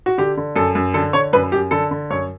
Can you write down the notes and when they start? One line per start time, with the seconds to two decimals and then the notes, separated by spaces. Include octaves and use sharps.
0.06 F#4
0.18 D3 G4
0.37 D3
0.56 F#2 A4
0.75 F#2
0.94 D3 A4
1.13 D3 C#5
1.33 F#2 B4
1.52 F#2 G4
1.71 D3 A4
1.91 D3
2.10 F#2 C#5